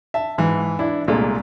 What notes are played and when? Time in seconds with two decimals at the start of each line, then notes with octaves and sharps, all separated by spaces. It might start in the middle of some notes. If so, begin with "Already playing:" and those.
0.14 E5 A5
0.38 G#2 E3
0.79 D4 E4
1.08 C2 A#2 G#3 A3